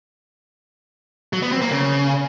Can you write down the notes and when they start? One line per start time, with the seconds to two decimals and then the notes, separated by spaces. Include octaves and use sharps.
1.33 F#3
1.42 B3
1.52 C4
1.62 A#3
1.71 C#3